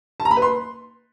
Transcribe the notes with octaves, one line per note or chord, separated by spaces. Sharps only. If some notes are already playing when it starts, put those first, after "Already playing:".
A5
A#5
B5
B4
C6